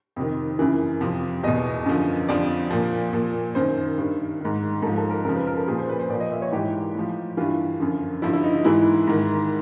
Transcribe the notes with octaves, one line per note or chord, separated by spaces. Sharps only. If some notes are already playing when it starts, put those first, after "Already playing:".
F2 C3 D#3
F#2 C#3 E3
F2 C3 F3
E2 B2 D#5
F#2 D3 F3
F2 D3 F3 D5
A#2 F3
A#2 F3
F#2 D#3 C5
G2 D#3
G#2 D#3
G#2 F3 A4
A4
A#4
F#2 C#3 F3 A#4
B4
A#4
A4
A#2 F3 G#4
C5
B4
C5
A#2 F3 D5
D#5
E5
C#5
G#2 E3 G4
A2 F3
G2 E3 F4
F#2 D3 F3
G2 D3 F3 E4
E4
D#4
D#4
G#2 E3 E4
G#2 D#3